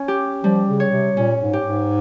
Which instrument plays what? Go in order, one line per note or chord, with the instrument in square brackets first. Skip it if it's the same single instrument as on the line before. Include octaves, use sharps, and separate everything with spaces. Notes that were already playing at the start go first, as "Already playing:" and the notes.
Already playing: [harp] C#4
G4
[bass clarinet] F3 [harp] G3
[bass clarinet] C#3
[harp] C#5
[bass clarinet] C3
[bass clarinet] A#2 [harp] C#4
[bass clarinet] G#2
[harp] G4
[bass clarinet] G#2